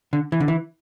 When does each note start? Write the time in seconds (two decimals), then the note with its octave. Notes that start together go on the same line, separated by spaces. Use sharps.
0.13 D3
0.32 E3
0.40 D3
0.48 E3